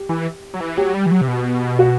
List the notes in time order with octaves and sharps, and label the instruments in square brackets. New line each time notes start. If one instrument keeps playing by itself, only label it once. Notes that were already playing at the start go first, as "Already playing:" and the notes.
Already playing: [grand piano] G4
[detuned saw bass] E3
F#3
E3
[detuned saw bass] F#3 [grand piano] G4
[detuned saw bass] G3
E3
F#3
C3
B2
[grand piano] F#4